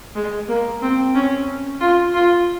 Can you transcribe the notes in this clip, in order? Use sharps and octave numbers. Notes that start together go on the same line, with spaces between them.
G#3
A#3
C4
C#4
F4
F4